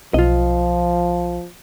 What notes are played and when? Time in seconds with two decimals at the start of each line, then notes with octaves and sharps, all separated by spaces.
0.14 B1 F3 F4 D#5